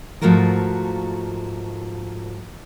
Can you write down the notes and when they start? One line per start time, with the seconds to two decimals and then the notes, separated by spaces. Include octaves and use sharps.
0.21 G#2 F3 A3 F4 F#4 A#4